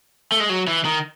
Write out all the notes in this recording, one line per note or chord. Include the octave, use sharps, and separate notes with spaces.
A3
G#3
F#3
E3
D#3